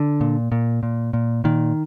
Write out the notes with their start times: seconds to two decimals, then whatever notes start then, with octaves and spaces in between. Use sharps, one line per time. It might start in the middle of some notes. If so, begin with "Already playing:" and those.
Already playing: D3
0.21 A#2
0.52 A#2
0.83 A#2
1.13 A#2
1.44 A#2 D#3